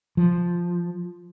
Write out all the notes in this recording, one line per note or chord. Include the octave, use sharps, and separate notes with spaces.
F3